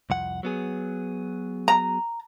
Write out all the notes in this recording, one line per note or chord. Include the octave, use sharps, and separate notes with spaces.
C2 F2 F#5
F#3 B3 G#4
A#5